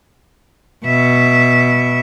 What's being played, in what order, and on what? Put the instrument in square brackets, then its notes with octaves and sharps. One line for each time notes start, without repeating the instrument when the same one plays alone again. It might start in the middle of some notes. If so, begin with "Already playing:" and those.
[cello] B2 E5